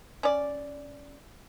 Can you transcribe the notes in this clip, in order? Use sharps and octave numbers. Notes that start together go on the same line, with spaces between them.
C#4 D5